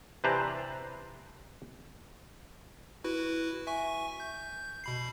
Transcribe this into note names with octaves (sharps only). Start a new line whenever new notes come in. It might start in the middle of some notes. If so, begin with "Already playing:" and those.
C3 E3 D4 B4 C5 A#5
E4 F#4 B4
E5 G#5 C#6
G6
B2 B5 C7